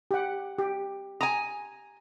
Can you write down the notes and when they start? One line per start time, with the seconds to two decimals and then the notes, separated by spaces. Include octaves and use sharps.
0.11 G4 F#5
0.59 G4
1.21 G#5 A#5 D#6